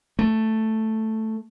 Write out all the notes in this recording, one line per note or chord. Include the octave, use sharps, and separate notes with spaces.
A3